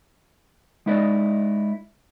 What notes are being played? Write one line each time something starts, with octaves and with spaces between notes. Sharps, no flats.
G#3 D#4 E4 B4 D5 D#5